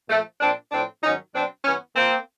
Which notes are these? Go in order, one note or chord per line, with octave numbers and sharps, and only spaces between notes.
A#2 F3 A3
A#2 F3 C4 D4
A2 F3 C4 D4
G#2 D#3 F#3 C#4 D#4
B2 F#3 C4 D4
G2 E3 B3 C#4
A#2 F3 A#3 C4